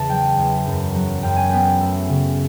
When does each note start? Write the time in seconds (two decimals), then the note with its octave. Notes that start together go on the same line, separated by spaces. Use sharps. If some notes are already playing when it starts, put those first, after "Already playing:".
Already playing: E2 C#3 A5
0.10 F#3 G5
0.38 E2
0.67 F#2
0.95 F#3
1.23 F#2 G5
1.36 G#5
1.50 B3 G5
1.81 A3
2.09 C#3